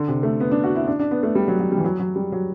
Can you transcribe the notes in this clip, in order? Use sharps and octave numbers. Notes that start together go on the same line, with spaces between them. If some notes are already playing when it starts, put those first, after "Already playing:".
Already playing: D3
C3
A3
B3
D4
F#4
E4
D4
D4
B3
A3
G3
F#3
F#3
G3
E3
F#3
F#3
G3
F#3